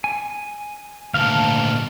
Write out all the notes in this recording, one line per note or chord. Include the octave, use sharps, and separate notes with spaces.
G#5
D2 A#2 F5 A5